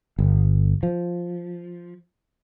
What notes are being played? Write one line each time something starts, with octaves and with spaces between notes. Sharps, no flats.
G1
F3